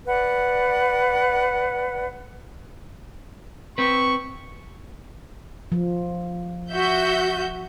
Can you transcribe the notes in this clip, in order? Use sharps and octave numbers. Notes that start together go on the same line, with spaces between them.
B4 D5 F#5
C4 B4 C#6
F3
F#4 E5 G6